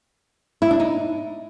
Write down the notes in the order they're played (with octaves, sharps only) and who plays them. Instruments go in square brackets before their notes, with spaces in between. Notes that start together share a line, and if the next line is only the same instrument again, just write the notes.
[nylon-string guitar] E4
D4
D#4